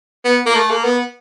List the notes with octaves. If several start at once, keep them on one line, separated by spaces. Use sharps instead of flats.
B3
A#3
A3
A#3
B3